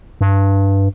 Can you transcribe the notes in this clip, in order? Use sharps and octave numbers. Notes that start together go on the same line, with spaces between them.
G2